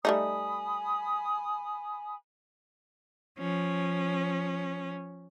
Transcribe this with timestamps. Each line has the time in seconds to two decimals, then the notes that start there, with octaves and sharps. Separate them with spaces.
0.05 G3 A3 D#4 G#5 B5 D#6
3.38 F3 C#4